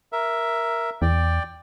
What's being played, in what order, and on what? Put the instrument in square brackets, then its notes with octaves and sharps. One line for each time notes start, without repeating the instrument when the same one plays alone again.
[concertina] A#4 E5
[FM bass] E2 [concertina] D5 G5